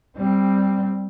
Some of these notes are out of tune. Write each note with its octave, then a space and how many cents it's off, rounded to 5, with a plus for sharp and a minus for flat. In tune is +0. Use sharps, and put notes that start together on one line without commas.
G3 +0 C4 +10